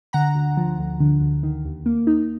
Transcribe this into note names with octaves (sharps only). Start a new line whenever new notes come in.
D3 F#5 A#5
D2
F3
D2
D3
D2
D#3
D#2
A#3
D#4